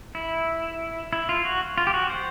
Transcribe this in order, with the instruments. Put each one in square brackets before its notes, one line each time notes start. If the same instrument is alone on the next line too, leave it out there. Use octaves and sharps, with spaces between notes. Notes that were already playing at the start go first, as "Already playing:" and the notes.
[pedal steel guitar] E4
E4
F4
F#4
F4
G4
F#4
C5